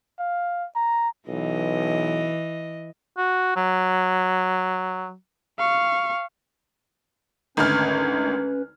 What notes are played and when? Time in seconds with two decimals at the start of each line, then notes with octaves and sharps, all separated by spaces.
0.19 F5
0.76 A#5
1.28 B1 E3 D#5
3.17 F#4
3.56 F#3
5.59 F5 C#6
7.57 G#1 D2 C#4 B4 F6